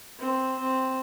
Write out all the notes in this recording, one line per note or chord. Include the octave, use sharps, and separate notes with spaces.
C4
C4